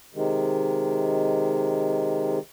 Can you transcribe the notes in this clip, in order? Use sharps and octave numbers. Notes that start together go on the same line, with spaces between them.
C3 D#3 G#3